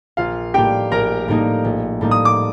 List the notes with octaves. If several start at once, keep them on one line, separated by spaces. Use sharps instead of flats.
A#1 F4 F5
A2 G3 A#3 D#4 G4 G5
A#1 A#4 A#5
A2 G3 A#3 D#4
A#1
A2 G3 A#3 D#4
D#6
D6